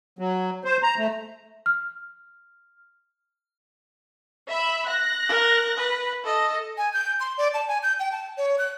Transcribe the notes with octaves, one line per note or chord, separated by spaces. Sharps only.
F#3
C5
A#5
A3
F6
E5 B5
F#6 A#6
A#4
B4
A4 D#5
G#5
G6
C6
D5
A5
G#5
G6
G5
A5
C#5
F#6